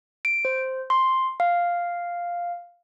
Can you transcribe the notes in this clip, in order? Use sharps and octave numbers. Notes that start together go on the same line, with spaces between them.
D7
C5
C6
F5